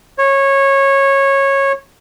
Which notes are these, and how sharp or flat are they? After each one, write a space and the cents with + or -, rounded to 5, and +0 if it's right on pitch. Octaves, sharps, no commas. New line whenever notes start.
C#5 -15